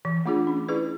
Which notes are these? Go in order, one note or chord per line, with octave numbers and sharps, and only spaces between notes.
E3
A3 D4 F4 G#4
C#4
E4 G#4 B4 D5